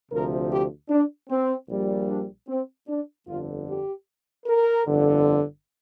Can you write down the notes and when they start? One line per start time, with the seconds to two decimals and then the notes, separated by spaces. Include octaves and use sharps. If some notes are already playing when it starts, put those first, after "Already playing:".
0.11 D2 C3 F3 A#4
0.50 G4
0.90 D4
1.30 C4
1.68 A#1 A#2 G3
2.08 D4
2.48 C4
2.88 D4
3.27 G1 F2 D3 F4
3.67 G4
4.46 A#4
4.87 G1 F2 D3